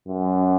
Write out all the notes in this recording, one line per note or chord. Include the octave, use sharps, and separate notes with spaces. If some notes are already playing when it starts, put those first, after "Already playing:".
F#2